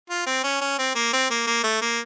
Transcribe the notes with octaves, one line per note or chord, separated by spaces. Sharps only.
F4
C4
C#4
C#4
C4
A#3
C4
A#3
A#3
A3
A#3